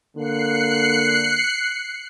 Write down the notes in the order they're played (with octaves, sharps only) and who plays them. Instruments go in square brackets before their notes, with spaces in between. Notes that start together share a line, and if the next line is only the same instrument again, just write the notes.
[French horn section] D3 A#3 [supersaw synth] F#6 C7 C#7